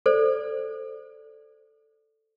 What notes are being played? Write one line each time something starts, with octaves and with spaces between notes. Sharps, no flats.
A4 C5 D5